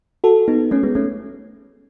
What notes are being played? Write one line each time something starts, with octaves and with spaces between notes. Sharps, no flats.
F#4 A4
B3 D#4
A3 C#4
G#3 B3
A3 C#4